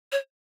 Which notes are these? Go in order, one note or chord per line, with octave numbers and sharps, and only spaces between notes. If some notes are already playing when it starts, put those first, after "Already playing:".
C#5